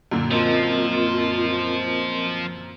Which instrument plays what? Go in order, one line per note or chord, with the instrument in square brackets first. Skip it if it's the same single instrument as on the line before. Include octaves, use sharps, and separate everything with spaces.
[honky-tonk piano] F#2 A#2 D3
[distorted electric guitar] F3 [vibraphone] C4 A#4 D#5 [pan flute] F4